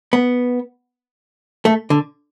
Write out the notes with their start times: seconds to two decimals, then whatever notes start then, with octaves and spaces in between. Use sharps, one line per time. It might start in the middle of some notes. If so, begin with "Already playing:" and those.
0.13 B3
1.65 A3
1.90 D3